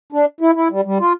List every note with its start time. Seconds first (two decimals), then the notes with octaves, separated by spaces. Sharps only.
0.12 D4
0.41 E4
0.55 E4
0.71 G3
0.85 G3
1.00 F4